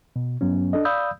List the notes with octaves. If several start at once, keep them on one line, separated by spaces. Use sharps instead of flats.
B2
G2 F#3 B3 C#4
D4 A4 D#5
D5 F5 B5 D#6 E6 G6